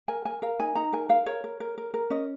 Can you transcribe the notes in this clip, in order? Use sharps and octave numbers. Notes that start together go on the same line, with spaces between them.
A#4 G#5
A#4 G#5
A#4 F5
D#4 G#5
D#4 A#5
A#4 G#5
A#4 F5
A#4 C#5
A#4
A#4
A#4
A#4
C#4 D#5